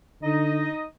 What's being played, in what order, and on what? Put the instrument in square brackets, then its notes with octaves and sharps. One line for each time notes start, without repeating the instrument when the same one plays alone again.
[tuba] D3 [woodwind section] D#4 D#5